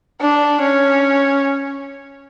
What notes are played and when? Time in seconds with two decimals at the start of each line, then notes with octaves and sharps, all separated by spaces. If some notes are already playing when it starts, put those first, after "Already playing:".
0.21 D4
0.61 C#4